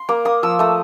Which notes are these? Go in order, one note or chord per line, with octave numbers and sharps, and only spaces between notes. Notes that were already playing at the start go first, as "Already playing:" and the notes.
Already playing: C6
A#3 D6
A#3 D#6
F3 E6
A3 D#6